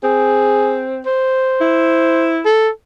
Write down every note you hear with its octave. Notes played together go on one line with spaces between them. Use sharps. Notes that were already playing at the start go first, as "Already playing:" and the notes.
C4 G#4
C5
E4
A4